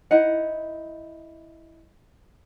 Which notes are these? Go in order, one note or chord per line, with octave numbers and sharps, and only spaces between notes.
D#4 E4 F#5